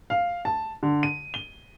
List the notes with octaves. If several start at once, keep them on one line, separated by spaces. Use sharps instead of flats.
F5
A5
D3
D#7
G7